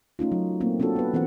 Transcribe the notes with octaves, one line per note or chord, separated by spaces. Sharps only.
A3 C#4 D#4 F4
F#3
A3 A#3 C4
C4 D4 F4 F#4 A4
B3 B4
E3 C4 A#4 F#5